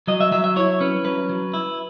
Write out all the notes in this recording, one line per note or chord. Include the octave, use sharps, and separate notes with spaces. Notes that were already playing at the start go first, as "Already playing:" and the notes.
F#3 D#5
E5
F#3 E5
E5
E4 C#5
C#4 B4
F#3 B4
F#3
E4